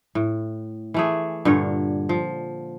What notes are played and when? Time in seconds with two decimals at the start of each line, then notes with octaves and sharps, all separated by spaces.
0.15 A2
0.94 E3 A3 G#4
1.45 G2 A#2 D3 C#5
2.09 F3